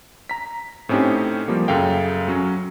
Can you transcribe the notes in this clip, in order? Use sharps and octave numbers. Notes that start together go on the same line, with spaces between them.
A#5 B6
A2 C4 C#4 D#4 G4
F3 G3 A#3
F#2 C#3 A4 F5 G5
F#3 C#4